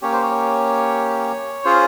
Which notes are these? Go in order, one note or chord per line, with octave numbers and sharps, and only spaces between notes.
A#3 C#4 G4 C#5
C5
C#5
C#4 F4 G#4 C5